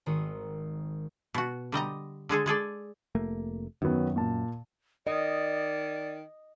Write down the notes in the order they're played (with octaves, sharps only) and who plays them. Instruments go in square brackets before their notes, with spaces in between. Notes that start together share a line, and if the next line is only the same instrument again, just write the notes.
[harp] G#1 D#3 C4 F#4 D#6
[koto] B2 F#4
D3 G3 D#5 A#5
D3 G#3 G#4 A4
G#3 G#4 A4 D5
[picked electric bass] F1 A3 A#3
[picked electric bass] F#2 [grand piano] D#3 F#3 B3
[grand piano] A#2 A5
[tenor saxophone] D#3 [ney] D5 [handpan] D#5